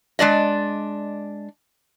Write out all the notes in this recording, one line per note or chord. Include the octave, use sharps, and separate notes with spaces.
G#3 D4 D5 D#5